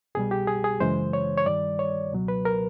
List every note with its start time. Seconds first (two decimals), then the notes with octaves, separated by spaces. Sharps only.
0.15 C2 B2 G3 G#4
0.31 G4
0.47 G#4
0.64 G#4
0.80 F#2 C#3 E3 G#3 C5
1.13 C#5
1.38 C#5
1.46 G2 D#3 G3 D5
1.79 C#5
2.12 C#2 B2 F#3
2.28 B4
2.45 A#4